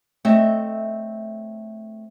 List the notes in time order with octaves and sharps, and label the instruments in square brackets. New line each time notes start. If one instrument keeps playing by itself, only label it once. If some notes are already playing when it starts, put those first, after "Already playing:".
[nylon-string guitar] A3 C4 C#5 D#5 E5